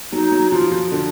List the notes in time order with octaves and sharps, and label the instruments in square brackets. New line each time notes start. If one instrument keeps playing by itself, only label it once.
[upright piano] F#3 [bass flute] D#4
[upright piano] F#3
[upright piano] F3 [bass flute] F4
[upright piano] F3
[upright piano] D3 [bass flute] D4